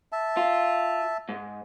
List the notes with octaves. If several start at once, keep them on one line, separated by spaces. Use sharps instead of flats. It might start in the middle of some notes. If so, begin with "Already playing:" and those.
E5 A5
F4
G#2